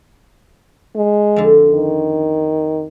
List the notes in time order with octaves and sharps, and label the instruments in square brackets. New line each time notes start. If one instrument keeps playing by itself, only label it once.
[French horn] G#3
[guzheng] F2 D3
[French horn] D#3